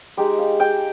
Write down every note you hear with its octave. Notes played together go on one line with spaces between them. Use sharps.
G#3 D#4 G4
F5
G5